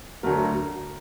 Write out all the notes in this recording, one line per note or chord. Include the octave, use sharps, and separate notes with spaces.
D2 D3 F#3 A3 A#4